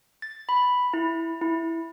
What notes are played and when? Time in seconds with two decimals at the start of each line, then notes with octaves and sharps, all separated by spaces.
0.22 A6
0.49 B5
0.94 E4
1.42 E4